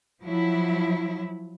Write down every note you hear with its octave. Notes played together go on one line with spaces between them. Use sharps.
F3 F#3 E4